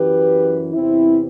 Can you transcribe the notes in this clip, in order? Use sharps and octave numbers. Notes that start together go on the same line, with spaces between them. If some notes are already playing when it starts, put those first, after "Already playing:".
Already playing: F#2 E3 G4 B4
E2 C3 E3 C4 E4